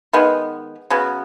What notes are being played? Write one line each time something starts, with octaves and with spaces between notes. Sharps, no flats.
D#3 G#3 B3
C#3 F#3 B3